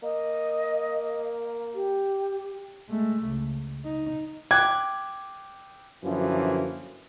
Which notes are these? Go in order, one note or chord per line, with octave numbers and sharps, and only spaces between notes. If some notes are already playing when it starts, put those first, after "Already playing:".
A#3 D#5
G4
G#3 A3
C#2
D#4
G5 D6 F#6 G#6
F#2 D3 E3 F3 A#3